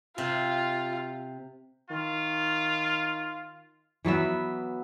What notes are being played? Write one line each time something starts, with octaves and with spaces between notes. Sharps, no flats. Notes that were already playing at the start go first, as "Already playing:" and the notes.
C3 F4
D#3 F4
E3 F#3 B3 E5